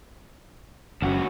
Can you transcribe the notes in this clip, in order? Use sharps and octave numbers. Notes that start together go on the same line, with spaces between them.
F#1 D#2 C#4 F#4